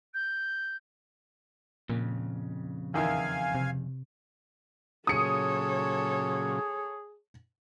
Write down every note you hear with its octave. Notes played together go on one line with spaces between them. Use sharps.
G6
F2 A#2 C#3
E2 D#3 E4 F5 G#5
C3
A#2 C#3 F#3 G#4 A4 C#5 D#6 C#7